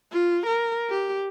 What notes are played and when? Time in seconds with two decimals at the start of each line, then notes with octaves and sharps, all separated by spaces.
0.12 F4
0.46 A#4
0.90 G4